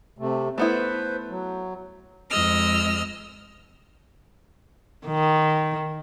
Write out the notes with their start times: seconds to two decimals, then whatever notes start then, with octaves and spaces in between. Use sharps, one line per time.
0.19 C3 A3
0.58 A3 B3 E4 B4 C5
1.29 F#3
2.30 F2 G#3 D#5 E6 F6
5.07 D#3